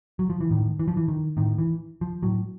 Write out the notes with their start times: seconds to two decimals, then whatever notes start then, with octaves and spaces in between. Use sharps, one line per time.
0.19 F#3
0.30 F3
0.41 E3
0.51 A2 D#3
0.79 E3
0.88 F3
0.97 E3
1.08 D#3
1.37 A2 D#3
1.58 E3
2.01 F3
2.23 A2 F#3